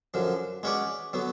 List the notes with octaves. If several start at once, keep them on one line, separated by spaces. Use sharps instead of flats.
F#2 D3 F3
G#3 C#4 F#4 B4 D5
D3 F#3 B3